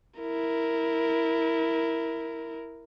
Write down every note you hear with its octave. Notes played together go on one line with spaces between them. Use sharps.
E4 A#4